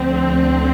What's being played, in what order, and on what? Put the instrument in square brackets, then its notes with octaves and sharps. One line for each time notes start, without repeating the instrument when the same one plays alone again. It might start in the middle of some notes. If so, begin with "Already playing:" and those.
Already playing: [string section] D2 D3 F3 C4